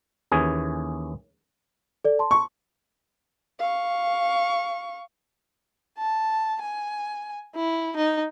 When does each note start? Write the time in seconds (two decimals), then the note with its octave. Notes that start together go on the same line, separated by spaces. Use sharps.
0.32 D#2 E3 C#4 G#4
2.04 A4 D5
2.19 A5 C6
2.31 C#6
3.59 F5 C#6
5.97 A5
6.61 G#5
7.55 E4
7.96 D#4